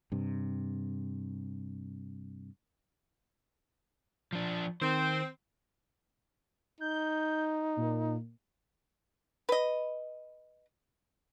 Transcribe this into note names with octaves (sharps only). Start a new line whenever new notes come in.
G2 C3
F3 D4
D#3 C4 C5
D#4 G6
A#2
B4 D#5